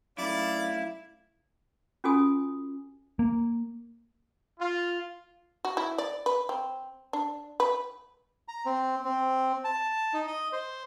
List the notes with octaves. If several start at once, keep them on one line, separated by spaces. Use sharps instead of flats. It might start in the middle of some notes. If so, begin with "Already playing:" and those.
F#2 A2 E4 D5 F5
C#4 F4 F#4 A4 G#5 D#6
A#3
F4
F#4
E4
D5
B4
C4
D4
B4
A#5
C4
C4
A5
D#4
D#5
C5